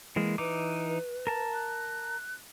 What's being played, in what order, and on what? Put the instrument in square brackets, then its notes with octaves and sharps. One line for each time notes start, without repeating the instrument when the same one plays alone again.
[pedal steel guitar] E3 G#3 A#3
[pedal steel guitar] E3 D#4 D6 [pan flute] B4
[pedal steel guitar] A#4 A5
[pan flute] F#6